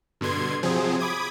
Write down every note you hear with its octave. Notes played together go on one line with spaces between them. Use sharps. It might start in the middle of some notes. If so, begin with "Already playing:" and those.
G2 B2 D3 C6 G#6
C3 F3 F#3 C4 G#4
B5 D6 D#6 G#6